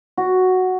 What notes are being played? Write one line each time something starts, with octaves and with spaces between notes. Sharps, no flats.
F#4